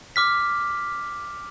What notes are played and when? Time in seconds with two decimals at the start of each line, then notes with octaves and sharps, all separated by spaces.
0.16 D6 F6 B6